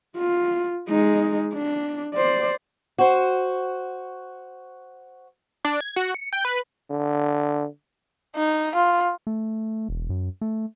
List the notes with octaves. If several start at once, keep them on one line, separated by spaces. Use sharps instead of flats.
F4
G#3 D#4
D4
C5 D5
F#4 C5
D4
G#6
F#4
C#7
G5
B4
D3
D#4
F4
A3
E1
F#2
A3